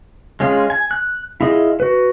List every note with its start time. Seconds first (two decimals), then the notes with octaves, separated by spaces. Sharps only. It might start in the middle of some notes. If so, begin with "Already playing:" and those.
0.40 G#3 C#4 F4 G#4
0.70 G#5
0.91 F#6
1.41 E4 F4 G#4 D#5
1.80 F#4 B4